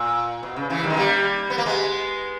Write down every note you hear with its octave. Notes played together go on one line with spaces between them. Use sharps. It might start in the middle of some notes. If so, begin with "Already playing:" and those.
Already playing: A#2
B2
C#3
C#3 E3
D#3 G3
G#3
G3 A#3
B3
A#3
G#3 B3